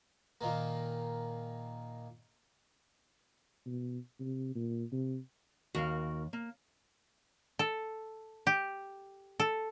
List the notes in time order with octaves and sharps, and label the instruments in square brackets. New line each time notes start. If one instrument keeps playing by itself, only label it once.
[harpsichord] A#2 D#3 A#3
[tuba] B2
C3
A#2
C3
[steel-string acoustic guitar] D#2 [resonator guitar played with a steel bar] F#4 A#4 F5
[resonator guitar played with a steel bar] A#3
[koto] A4
G4
A4